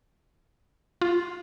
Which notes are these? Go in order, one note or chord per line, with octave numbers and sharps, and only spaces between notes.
F4